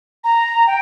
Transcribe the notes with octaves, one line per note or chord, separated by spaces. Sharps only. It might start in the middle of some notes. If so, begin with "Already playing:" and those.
A#5
G5